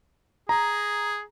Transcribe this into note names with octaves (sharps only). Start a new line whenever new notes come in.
G#4 A#5